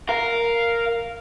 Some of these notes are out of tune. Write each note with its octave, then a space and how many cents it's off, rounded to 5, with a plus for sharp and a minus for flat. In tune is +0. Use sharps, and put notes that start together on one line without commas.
A#4 +0 F5 +0